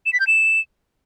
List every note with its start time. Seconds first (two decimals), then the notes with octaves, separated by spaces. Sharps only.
0.06 E7
0.13 B6
0.20 G6
0.27 E7